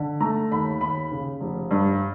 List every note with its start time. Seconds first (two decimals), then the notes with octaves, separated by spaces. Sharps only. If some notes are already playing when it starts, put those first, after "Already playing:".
Already playing: D3
0.21 A3 A#5
0.52 D#2 B5
0.81 D#2 B5
1.12 C#3
1.40 F1
1.71 G2